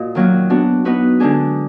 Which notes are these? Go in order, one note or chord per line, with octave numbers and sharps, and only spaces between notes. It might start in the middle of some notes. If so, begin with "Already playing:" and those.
Already playing: A#2 F#4 D#5
D#3 F#3 A#3 D#4
B3 D4 F#4
B3 D#4 F#4 B4
D3 G#3 D4 G#4